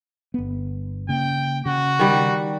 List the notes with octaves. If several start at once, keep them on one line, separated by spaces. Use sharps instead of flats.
G1 B3
C#3 A#3 G5
C#3 F#4
D#3 G3